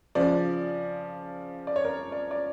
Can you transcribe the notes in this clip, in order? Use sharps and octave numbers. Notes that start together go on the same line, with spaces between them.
C#3 F3 D5
D5
C#5
A#4
D5
D5